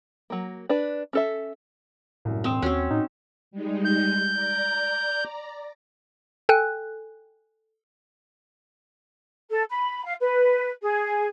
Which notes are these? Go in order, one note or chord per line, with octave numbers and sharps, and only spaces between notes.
F#3 A#3
D4 B4
C#4 A4 E5
C2 F#2 A2
E1 C4 D#6 E7
D#2 C4 C#4 F#4
A2 D#4
G3 G#3 D#4
G6
D5 A#5
A4 G5 G#5 F#6
A4
B5
F5
B4
G#4